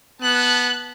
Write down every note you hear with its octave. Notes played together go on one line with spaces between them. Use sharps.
B3 A5 F#6